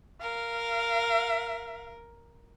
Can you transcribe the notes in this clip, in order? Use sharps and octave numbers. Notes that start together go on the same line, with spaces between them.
A#4 F5